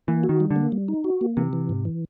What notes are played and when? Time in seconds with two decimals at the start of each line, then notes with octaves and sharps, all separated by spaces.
0.08 E3 A#3
0.24 F#4
0.29 D#3
0.40 G3
0.51 D3
0.56 A#3
0.72 G3
0.88 D#4
1.04 F#4
1.21 A#3
1.37 C3 E3
1.53 E3
1.69 G#2
1.85 E3